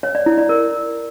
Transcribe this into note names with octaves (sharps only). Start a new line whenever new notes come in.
C#5
D5
E4
D5
A#4